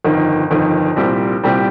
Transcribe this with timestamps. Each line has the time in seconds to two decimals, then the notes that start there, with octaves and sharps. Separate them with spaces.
0.05 G1 F2 D#3
0.51 G1 F2 D#3
0.96 C2 A#2 G3 C4 G4
1.43 C2 A#2 G3 C4 G4